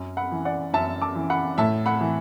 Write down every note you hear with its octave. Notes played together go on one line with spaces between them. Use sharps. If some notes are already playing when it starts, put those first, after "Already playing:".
Already playing: F#2
F#5 B5
E3
D5 F#5
F#2 E5 A5
A5 D6
E3
F#5 B5
A2 E5 A5
F#5 B5
E3